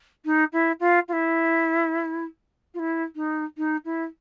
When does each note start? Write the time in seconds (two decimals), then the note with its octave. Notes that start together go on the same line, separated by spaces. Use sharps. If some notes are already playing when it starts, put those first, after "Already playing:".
0.25 D#4
0.52 E4
0.80 F4
1.08 F4
1.12 E4
2.74 F4
2.79 E4
3.15 D#4
3.57 D#4
3.85 E4